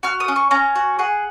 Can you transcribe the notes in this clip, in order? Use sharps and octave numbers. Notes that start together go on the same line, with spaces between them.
F#4 F6
D#6
C#4
C#6
C#4 A#5
F#4
G#4 F#5